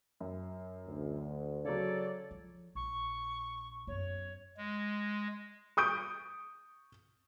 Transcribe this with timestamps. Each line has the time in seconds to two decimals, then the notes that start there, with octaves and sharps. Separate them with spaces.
0.20 F#2
0.86 D2
1.65 C#3 F#3 A4 C#5 D5
2.31 F3
2.75 A#1 C#6
3.87 F#2 B3 C#5
4.57 G#3
5.77 C#6 D#6 G6 D7